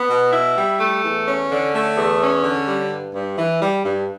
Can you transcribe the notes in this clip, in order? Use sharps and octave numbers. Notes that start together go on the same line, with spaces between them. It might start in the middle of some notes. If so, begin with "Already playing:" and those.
Already playing: B3
B2
E4
G3
A3
E2
C#4
D3
A3
E2
C#4
D3
G3
G2
G2
E3
G3
G2